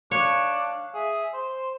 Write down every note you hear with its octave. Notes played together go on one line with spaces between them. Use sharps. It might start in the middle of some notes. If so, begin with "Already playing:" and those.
D4 C#5 F5
G#4 E5
C5 C6